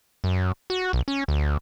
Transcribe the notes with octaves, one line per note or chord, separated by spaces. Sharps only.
F#2
F#4
B1
C#4
D2